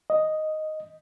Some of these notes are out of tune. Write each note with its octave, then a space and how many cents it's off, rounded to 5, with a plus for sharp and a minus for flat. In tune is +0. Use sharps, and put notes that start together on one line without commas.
D#5 +0